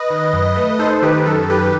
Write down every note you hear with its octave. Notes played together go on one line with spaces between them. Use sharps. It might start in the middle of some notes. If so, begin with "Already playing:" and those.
Already playing: B4 D#5
D#3
F#2
A3
D#4 A4 C5
D#3 G4 B4
F#2 A4
D#3 G4 B4